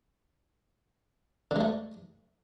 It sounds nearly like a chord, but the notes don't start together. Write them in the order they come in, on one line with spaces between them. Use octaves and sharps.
D3 G#3 A3